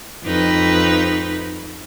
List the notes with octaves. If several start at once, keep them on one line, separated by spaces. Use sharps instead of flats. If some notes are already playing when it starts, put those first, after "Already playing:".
F2 D#4 B4